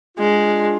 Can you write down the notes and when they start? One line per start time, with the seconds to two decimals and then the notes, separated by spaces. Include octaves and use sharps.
0.17 G#3 D4 F4